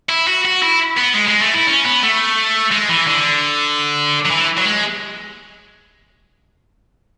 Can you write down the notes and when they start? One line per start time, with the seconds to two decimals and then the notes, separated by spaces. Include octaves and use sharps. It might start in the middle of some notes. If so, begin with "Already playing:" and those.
0.09 E4
0.28 F#4
0.45 F#4
0.63 E4
0.98 B3
1.14 G#3
1.28 G#3
1.42 A3
1.54 E4
1.67 C#4
1.85 B3
2.03 A3
2.72 G#3
2.89 E3
3.08 D3
4.25 F#3
4.30 E3
4.57 F#3
4.66 G#3